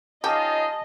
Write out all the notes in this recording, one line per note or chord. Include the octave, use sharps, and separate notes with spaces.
C#4 D#4 F4 G4 D#5 G#5 A5 D#6